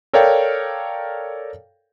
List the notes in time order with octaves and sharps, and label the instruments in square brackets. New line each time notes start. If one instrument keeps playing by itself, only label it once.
[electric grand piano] A4 A#4 C#5 D5 F5 G5